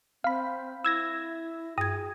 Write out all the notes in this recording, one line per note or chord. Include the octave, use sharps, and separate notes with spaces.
C4 F5 B5
E4 E6 G#6 A#6
G2 G#4 D#6 G#6